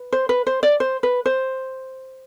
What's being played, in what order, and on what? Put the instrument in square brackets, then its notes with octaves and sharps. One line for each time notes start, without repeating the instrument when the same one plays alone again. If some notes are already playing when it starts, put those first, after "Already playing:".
Already playing: [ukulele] B4
C5
B4
C5
D5
C5
B4
C5